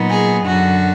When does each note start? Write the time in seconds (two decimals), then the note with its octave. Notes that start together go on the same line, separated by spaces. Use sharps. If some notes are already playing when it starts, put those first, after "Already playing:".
Already playing: A#2 F#3 B3 D#4
0.08 G#4
0.46 F#2 D3 F#3 F#4